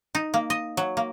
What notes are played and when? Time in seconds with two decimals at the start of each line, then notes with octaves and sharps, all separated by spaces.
0.15 D#4
0.34 A#3
0.50 D#5
0.77 F#3
0.97 A#3